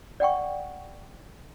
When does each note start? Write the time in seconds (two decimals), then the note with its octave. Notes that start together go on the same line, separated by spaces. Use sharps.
0.20 D5 F#5 G5 C#6